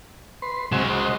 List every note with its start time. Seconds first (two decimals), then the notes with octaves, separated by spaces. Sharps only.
0.42 B4 C6
0.72 C#3 F#3 G#3 C4 G#5
0.90 F#4 C5 D#5